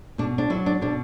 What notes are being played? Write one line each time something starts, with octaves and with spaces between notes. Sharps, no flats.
B2 D4
D4
F#3 E4
D4
B2 D4